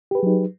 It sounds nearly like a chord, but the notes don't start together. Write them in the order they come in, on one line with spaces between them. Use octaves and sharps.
G4 B4 G#4 F#3 D#4